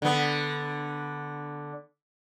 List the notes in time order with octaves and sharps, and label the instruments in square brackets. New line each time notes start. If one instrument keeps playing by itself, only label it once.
[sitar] D3 B3